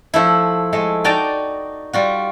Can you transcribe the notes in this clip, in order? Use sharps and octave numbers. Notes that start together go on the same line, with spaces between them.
F3 A3 E4
G#3 A3
D#4 F#4 D5 G5 A5 A#5
G3 F4 F#4